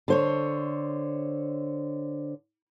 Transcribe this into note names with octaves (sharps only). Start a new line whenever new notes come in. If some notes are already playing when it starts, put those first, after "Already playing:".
D3 C5 C#5